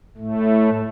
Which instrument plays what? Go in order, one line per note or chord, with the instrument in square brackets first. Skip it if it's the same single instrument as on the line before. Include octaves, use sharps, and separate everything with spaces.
[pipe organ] A2 A3